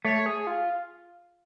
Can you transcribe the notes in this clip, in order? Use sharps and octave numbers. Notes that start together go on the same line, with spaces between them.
A3 C#5
G#4
F4